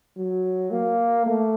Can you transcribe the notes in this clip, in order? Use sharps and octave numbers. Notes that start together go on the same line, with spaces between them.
F#3
A#3
A3